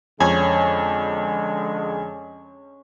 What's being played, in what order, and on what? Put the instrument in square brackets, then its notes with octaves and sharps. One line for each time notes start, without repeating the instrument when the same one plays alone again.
[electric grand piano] F2 [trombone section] D3 G#3 [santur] C#4 [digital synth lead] G#5